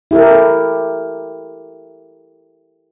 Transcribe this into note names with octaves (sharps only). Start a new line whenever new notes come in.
E4 G4 A4 A#4